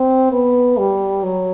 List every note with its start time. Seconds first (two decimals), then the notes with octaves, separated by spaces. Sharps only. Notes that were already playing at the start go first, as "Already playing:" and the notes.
Already playing: C4
0.32 B3
0.78 G3
1.23 F#3